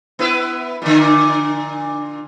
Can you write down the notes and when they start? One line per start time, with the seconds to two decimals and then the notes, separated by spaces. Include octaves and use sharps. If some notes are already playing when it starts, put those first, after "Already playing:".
0.19 B3 E4 B4
0.82 A#2 D3